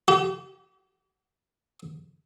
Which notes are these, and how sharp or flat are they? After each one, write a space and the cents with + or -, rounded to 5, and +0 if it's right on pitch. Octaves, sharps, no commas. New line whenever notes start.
G4 -40